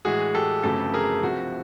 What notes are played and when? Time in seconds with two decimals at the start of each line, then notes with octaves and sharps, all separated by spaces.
0.05 A2 E3 G#3 F#4 G#4
0.35 G4 A4
0.63 G1 F2 C#3 F#3 A3 G4 A4
0.94 G#4 A#4
1.22 C2 C3 F3 F#4